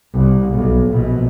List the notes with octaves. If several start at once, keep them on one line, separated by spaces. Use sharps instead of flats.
C2
B1
A#1 B2